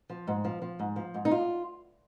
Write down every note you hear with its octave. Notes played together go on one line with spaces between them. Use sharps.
F3
G#2
F3
F3
G#2
F3
G#2
D#4
F4